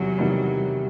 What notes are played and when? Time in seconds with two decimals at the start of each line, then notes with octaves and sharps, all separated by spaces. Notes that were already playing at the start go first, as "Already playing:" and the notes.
Already playing: E2 C3 D#3 F#3 G3
0.18 E2 C3 D#3 G3